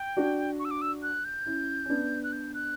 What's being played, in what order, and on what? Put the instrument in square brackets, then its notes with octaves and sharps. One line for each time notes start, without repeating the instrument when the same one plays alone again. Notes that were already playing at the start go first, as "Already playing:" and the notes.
Already playing: [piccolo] G5
[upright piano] D4 F#4
[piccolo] C#6
E6
D6
E6
F#6
G6
[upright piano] C#4 E4
C#4
B3 D4
[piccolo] F#6
G6
F#6